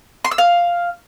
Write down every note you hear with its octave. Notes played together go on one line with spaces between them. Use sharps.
C6
E6
F5